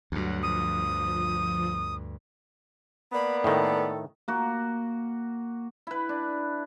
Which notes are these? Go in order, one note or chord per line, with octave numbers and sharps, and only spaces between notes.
D2 G2 F#3 F#5
F3 D#6
A#3 B3 D5 B5
A2 D#3 A4
A#3 F#4
E4 B4
D4